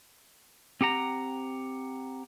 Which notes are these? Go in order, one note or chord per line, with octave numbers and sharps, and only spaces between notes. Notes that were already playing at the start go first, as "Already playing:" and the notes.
C4 G4 F#5 A#5